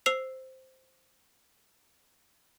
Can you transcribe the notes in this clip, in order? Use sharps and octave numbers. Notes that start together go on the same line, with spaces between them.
C5 E6 C7 F7